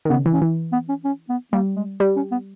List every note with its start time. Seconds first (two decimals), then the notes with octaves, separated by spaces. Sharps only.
0.05 D#3
0.09 C#3 B3
0.26 E3
0.33 C#4
0.41 E3
0.73 B3
0.89 C#4
1.04 C#4
1.29 B3
1.53 G3 A#3
1.76 G#3
2.00 G3
2.16 C#4
2.32 B3